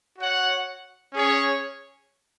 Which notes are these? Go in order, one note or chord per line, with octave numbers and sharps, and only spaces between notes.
F#4 C#5 F#5
C#4 G#4 C#5